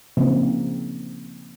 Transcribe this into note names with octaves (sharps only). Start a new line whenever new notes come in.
C#3 F3 A#3 C4 D#4